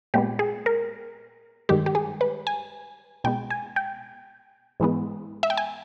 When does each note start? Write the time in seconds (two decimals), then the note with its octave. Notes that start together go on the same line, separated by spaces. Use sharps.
0.14 A#2 G#3 B3 G4
0.39 G#4
0.66 A#4
1.69 G2 D#3 G#3 G4
1.86 G4
1.95 G#4
2.21 B4
2.47 G#5
3.24 B2 G#3 B3 G5
3.50 G#5
3.76 G5
4.80 G#2 E3 G#3 B3
5.43 E5
5.50 G5
5.57 G#5